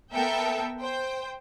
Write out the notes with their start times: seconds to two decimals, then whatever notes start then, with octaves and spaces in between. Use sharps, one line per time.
0.13 B3 A4 A#4 E5 G5
0.80 C5 G5